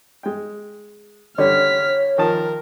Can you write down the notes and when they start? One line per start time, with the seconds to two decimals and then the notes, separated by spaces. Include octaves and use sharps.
0.23 G#3 G5
1.38 D3 G3 C#4 C#5 F6 B6
2.18 D#3 F3 A#4 A5